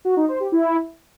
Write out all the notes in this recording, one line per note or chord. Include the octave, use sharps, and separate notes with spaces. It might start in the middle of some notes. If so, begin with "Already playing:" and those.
F#4
D#4
C5
G4
E4